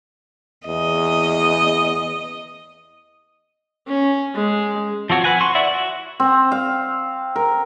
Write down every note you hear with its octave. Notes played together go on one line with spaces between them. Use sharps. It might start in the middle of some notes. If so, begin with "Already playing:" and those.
E2 D#5
C#4
G#3
F3 C4 F#4 C#5
B4 F#5 G#5
F#4 C6 C#6
E4 D5 E5 F#5
F#4
C4
F5
A#4